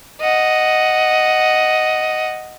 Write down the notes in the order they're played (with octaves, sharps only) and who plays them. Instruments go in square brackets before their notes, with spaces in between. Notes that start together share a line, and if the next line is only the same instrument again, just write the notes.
[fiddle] D#5 F#5